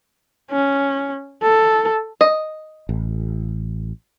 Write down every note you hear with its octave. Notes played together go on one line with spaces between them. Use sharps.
C#4
A4
D#5
A1